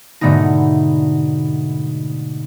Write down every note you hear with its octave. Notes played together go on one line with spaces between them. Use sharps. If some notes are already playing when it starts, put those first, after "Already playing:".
G#2 B2 D3 A3 B3 D#4